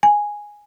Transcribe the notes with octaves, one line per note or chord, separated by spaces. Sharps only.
G#5